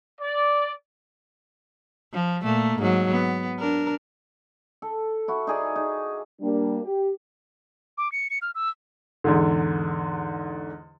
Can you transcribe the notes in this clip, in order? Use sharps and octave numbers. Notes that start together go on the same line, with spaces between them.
D5
F3
A#2 A3 A#3
G#2 F#3
B3
D4 A#4
A4
E4 F#4
D#4 G#4 D5
D#4
G3 A#3 D4
G4
D6
C#7
C#7
F6
E6
E2 G#2 D3